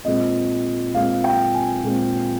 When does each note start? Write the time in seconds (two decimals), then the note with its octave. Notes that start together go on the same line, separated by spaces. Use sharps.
0.05 A#2 G#3 C4 D#5
0.94 A#2 G#3 C4 F5
1.24 G5
1.55 G#5
1.83 A#2 G#3 C4